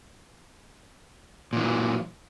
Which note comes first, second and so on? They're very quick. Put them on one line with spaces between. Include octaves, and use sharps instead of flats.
A#2 E3 F#3